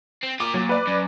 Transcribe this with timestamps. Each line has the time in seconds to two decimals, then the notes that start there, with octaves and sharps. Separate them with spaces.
0.23 C4
0.40 F4 A#4 D6
0.54 A#2 F#3
0.69 B4 D5
0.87 F#2